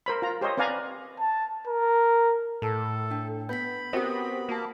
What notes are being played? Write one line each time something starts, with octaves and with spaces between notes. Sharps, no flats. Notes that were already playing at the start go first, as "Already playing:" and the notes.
A#4 C5 B5
F4 A#5
G4 C5 C#5 D#5
C4 B4 D5 F5 G#5 A#5
A5
A#4
A2 A4
D4 G5
B3 B5 G6 B6
B3 C4 F#4 G4 A#4 D#6
A#3 F#4 A5